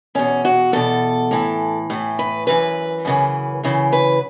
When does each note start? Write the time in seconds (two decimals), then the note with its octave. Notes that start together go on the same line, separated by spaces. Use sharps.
0.15 E2 B2 C#4
0.45 F#4
0.73 E2 B2 A4
1.31 A2 E3
1.90 A2 E3
2.19 B4
2.47 F#2 C#3 E3 B4
3.05 F#2 C#3 E3
3.63 F#2 C#3 E3
3.92 B4